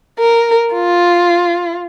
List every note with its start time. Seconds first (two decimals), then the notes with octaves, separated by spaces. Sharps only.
0.19 A#4
0.74 F4